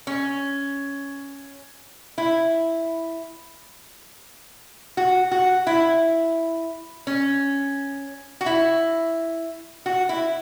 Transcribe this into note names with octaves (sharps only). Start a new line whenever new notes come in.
C#4
E4
F#4
F#4
E4
C#4
F#4
E4
F#4
E4